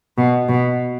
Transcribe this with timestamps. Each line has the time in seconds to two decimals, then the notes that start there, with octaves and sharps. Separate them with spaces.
0.18 B2
0.49 B2